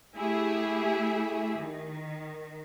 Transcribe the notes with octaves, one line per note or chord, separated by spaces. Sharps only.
A3 E4 G4 G#4 E5
D#3